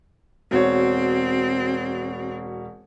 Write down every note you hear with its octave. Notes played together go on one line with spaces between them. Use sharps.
E1 C4 F#4 C#5